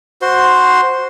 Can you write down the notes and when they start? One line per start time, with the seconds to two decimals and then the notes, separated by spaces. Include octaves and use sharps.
0.22 F#4 C5 C6